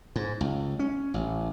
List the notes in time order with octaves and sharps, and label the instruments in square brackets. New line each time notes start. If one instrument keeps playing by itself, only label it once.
[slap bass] G#2
C#2
C#4
A1